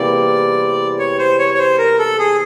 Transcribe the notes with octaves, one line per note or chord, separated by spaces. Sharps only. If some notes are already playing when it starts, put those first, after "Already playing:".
Already playing: E2 C3 E3 G3 A#3 D5
C#5
C5
C#5
C#5
C5
A#4
A4
G#4